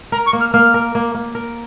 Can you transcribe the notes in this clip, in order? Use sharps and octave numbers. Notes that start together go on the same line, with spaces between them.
A#4 A#5
C#6
A#3
F6
A#3 F6
A#4
A#3
A#3
A#4